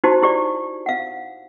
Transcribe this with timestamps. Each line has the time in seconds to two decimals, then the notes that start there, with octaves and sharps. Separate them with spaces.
0.04 D#4 E4 F#4 G4 C5 A5
0.23 E4 G4 D5
0.86 F5 F#5